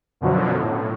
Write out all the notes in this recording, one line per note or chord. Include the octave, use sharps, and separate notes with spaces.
F#2 B2 D3 F3 F#3
A2